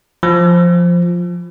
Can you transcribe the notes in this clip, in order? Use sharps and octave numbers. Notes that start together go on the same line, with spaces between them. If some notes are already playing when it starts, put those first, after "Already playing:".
F3